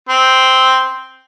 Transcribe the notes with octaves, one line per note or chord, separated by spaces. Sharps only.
C4